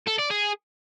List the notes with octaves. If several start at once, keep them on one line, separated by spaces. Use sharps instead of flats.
A4
D5
G#4